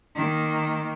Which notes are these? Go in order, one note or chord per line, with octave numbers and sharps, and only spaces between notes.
D#3 A#3